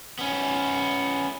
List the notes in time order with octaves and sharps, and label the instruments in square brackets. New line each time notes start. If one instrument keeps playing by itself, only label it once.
[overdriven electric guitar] B3 C#4